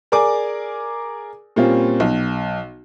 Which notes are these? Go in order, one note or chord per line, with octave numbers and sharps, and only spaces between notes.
G#4 A#4 D5 G#5 D6
A#2 G3 A#3 C4 C#4 F4
B1